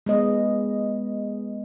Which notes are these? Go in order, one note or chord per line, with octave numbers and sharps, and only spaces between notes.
G#3 B3 D#5